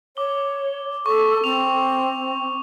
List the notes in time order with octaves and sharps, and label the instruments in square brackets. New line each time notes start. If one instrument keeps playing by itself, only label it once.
[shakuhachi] C#5 [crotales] D6 G7
[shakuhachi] A4 [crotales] C#6
[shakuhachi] C4 [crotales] F7